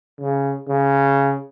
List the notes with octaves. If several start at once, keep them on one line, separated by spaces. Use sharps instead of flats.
C#3
C#3